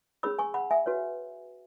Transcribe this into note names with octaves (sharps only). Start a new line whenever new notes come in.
C#4 G#4 C#5 B5 E6
G#5 C#6
F#5 B5
E5 G#5
F#4 B4 C#5